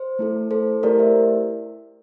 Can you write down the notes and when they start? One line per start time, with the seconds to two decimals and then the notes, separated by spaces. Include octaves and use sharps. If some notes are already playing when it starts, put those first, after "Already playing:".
Already playing: C5
0.19 A3 E4 A4
0.51 A4 C5
0.83 A3 E4 G4 A#4 D5
0.99 C5 E5